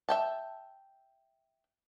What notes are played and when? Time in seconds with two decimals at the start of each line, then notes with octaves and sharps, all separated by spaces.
0.09 E5 G5 A5